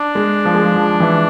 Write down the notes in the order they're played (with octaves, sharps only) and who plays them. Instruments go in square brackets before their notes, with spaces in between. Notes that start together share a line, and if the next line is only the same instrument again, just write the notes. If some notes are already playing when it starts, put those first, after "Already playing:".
Already playing: [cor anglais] D4
[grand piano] G#3
F3
G#3
F3
F3
E3